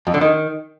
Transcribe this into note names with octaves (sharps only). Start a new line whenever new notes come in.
F2
D3
D#3